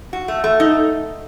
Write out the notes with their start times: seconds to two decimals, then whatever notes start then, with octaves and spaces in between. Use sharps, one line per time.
0.13 F#4
0.28 A3
0.44 A3
0.60 D#4